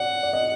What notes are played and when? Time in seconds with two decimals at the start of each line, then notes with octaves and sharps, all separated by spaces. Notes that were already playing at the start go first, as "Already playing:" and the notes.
Already playing: C#5 D5 F#5
0.23 D5
0.33 D#5